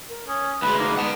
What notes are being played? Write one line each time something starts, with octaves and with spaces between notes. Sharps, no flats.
A#4
C#4 D#6
D2 G#3 B4 B5
A#3 D#4
B3 F#5 A5